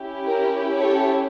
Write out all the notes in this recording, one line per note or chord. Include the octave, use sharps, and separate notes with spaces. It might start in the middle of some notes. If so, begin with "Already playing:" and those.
Already playing: C#4 E4 G4
A#4
A4 C#5